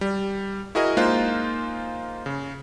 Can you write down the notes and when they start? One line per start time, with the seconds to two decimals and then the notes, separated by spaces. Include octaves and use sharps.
0.01 G3
0.75 E4 F#4 G#4 A#4 D#5
0.97 G#3 A#3 D#4 F4 C5 F#6
2.26 C#3